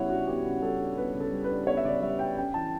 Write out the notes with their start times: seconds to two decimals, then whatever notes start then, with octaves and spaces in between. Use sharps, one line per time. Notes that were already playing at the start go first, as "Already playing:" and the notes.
Already playing: C#3 G3 B3 E4 C#5 F#5
0.09 D4 F#4
0.27 B3 G4
0.44 C#3
0.62 G3 A4
0.80 D4
0.97 B3 B4
1.15 C#3
1.20 A4
1.32 G3
1.44 B4
1.50 D4
1.67 B3 C#5
1.77 E5
1.85 C#3 D5
2.02 G3 E5
2.19 D4 G5
2.37 C#4 G5
2.54 E3 A5